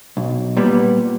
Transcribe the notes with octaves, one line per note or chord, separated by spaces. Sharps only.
B1
A#2 G3 B3